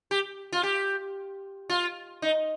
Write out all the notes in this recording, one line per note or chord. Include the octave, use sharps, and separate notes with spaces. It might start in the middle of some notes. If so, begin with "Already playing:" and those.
G4
F4
G4
F4
D#4